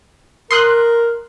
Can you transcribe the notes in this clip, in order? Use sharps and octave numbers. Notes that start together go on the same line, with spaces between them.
A#4 C6 D#6 F#6